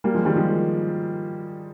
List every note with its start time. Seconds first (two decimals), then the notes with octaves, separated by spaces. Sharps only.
0.04 G3 A#3
0.14 F3 G#3
0.25 D#3 G3
0.36 F3 G#3